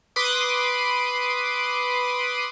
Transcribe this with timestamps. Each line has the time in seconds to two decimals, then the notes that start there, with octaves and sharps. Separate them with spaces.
0.16 B4 C6 D6 D#6